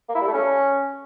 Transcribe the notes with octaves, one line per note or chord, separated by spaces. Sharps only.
A#3
E4
G3
A3
C#4